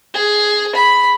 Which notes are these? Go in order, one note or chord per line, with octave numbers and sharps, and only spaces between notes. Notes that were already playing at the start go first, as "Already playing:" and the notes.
G#4
B5